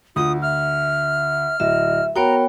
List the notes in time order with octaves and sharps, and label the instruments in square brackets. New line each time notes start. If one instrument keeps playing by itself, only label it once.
[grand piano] D2 [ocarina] F4 [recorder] D#6
[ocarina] E5 [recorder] F6
[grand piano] D1 [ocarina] D#5 [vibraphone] E5
[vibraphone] B3 C#5 G5 [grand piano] F#4 [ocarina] A#4 [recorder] A#5